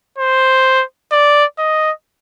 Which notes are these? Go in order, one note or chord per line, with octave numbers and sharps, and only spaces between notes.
C5
D5
D#5